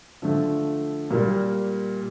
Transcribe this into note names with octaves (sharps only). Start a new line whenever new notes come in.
D3 F3 A3
A#2 G3 A#3